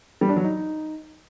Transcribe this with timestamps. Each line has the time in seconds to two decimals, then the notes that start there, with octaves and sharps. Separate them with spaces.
0.21 G3
0.29 D4
0.36 F#3
0.44 D#4